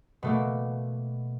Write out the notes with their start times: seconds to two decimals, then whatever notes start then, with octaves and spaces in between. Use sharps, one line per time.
0.23 B2 A3 A#3